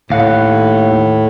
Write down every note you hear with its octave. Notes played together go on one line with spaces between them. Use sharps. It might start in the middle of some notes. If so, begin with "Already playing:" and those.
D#2 A2 F5 F#5